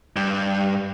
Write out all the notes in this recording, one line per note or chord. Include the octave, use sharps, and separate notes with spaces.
G2